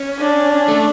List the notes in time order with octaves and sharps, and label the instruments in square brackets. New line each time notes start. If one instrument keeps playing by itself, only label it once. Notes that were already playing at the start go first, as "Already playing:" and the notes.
Already playing: [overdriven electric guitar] C#4
[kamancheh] D4
[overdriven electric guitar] A3